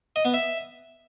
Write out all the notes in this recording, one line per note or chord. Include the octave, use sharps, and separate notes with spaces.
D#5
B3
E5